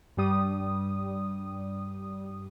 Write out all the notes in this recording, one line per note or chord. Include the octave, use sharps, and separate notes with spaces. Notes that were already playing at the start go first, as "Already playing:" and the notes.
G2 G3 D#6